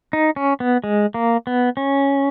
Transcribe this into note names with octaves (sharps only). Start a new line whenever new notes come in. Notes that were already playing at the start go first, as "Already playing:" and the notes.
D#4
C#4
B3
G#3
A#3
B3
C#4